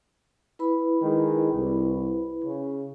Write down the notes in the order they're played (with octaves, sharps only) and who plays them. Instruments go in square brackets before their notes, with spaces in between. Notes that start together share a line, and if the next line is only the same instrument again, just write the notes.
[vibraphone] E4 B4 B5
[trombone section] D#3 G#3
C2
C#3